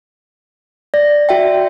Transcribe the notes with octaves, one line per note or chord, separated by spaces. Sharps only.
D5 A#6
F#4 E5 G5